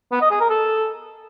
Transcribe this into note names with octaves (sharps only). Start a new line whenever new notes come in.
B3
D#5
G#4
A#4
A4